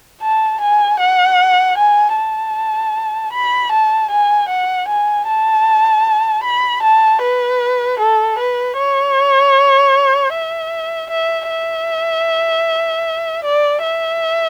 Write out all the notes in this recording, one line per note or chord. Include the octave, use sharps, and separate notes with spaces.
A5
G#5
F#5
G#5
A5
B5
A5
G#5
F#5
G#5
A5
B5
A5
B4
A4
B4
C#5
E5
E5
E5
D5
E5